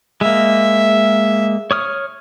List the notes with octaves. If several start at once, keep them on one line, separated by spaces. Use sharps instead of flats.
G#3 A#3 E5
C#5 D#6 F6